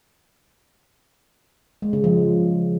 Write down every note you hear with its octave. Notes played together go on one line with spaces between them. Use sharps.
G#3
C#3
F3